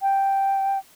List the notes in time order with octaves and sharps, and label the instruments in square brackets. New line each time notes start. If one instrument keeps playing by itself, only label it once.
[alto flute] G5